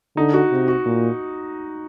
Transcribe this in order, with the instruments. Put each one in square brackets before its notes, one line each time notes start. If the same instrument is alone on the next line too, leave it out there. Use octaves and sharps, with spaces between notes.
[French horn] D3 [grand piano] D#4
[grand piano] F#4
[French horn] C3
[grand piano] F#4
[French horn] A#2